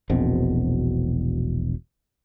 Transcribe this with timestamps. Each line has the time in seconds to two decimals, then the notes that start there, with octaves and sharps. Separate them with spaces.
0.10 E1 A#1 B2 C4